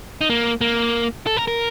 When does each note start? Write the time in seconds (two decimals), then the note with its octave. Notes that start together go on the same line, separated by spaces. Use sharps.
0.21 D#4
0.30 A#3
0.61 A#3
1.27 A4
1.37 A#4
1.48 A#4